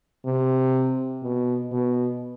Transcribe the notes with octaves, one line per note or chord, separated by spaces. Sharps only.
C3
B2
B2